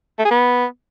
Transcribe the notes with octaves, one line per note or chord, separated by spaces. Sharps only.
A3
G#4
B3